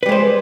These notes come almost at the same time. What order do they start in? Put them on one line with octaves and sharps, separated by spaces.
B4 G3 G#3 C5